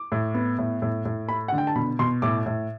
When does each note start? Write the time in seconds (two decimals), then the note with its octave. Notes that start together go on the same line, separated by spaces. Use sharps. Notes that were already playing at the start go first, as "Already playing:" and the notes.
Already playing: D6
0.12 A2
0.34 B3
0.59 A2
0.82 A2
1.05 A2
1.28 A3 B5
1.48 D3 F#5
1.58 G5
1.67 A5
1.76 B2 B5
1.99 B2 C6
2.22 A2 D6
2.46 A2